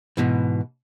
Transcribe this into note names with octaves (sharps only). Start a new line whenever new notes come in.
G#2 B2 E3